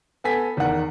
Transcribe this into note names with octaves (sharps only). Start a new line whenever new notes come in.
B3 A4 G#5 B6
E2 D#3 A#4 F#5